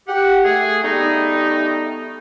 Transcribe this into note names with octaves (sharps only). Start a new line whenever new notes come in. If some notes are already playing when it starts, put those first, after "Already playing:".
G4 F#5
A3 G#4
G3 A3 B3 D#4